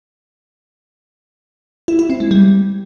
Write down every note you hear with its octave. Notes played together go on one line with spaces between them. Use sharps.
E4
E4
C4
G#3
G3